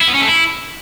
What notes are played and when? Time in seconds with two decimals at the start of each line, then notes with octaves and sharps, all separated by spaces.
0.01 E4
0.08 B3
0.15 C#4
0.21 A3
0.28 E4